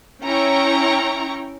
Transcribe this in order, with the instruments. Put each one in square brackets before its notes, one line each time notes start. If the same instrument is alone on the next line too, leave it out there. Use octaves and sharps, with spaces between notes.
[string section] C#4 E4 G5 A#5 C#6